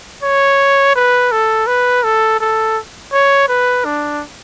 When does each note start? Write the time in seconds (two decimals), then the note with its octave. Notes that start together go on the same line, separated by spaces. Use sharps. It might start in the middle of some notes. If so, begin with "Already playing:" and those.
0.23 C#5
0.95 B4
1.32 A4
1.67 B4
2.03 A4
2.40 A4
3.12 C#5
3.48 B4
3.85 D4